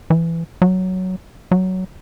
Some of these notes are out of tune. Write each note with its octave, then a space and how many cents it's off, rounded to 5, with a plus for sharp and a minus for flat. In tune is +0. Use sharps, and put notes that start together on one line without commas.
E3 +15
F#3 +5
F#3 +10